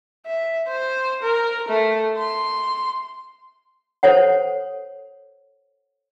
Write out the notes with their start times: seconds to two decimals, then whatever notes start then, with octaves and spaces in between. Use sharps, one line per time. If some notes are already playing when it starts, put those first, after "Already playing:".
0.26 E5
0.68 C5
1.23 A#4
1.69 A3
2.18 C6
4.03 A4 C5 C#5 F#5